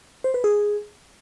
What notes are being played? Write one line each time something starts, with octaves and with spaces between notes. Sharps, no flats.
C5
B4
G#4